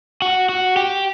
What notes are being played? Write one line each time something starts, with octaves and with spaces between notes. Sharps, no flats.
F#4
F#4
G4